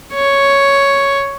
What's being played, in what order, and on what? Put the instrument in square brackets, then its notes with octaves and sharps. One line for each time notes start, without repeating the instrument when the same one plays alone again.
[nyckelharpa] C#5